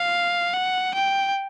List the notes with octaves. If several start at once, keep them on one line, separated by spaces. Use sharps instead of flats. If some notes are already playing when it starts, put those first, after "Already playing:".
Already playing: F5
F#5
G5